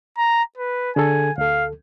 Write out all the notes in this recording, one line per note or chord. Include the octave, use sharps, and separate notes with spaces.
A#5
B4
D3 G#4 A4 G#5
D2 A4 F5